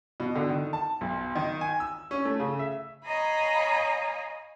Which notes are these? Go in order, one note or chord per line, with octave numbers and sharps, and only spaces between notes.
B2
D3
D#3
A5
B1
D#3
G#5
E6
C#4
A3
C#3
E5
C#5 D#5 F5 G#5 A#5 B5